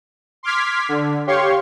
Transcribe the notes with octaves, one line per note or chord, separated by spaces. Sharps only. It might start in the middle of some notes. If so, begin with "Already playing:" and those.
C6 D6 F6 G#6 B6
D3
G4 C#5 F5 C6 C#6